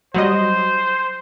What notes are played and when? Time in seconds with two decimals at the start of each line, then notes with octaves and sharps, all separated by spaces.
0.14 F#3 G3 C5 D#5